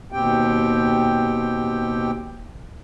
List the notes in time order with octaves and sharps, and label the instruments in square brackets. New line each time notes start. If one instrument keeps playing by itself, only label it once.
[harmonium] D#2 B2 C4 G4 G5